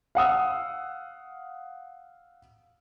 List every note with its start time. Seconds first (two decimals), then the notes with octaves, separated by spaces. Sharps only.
0.15 F5 F#5 D#6 E6